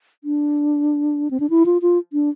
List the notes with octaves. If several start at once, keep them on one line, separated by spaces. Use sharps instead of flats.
D4
C4
D4
E4
F4
F4
D4